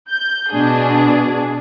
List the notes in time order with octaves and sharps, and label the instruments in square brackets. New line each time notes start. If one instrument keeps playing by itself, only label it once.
[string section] G6
B2 D4 G#4